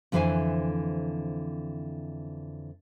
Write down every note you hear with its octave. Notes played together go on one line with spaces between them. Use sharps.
F2 D3 E3 C5 E5 G#5